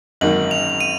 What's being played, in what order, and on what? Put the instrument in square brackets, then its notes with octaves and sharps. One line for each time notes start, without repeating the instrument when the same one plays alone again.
[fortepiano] G#1 F#2 D#3 A#3 [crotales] F#7
[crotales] F7
F7
D#7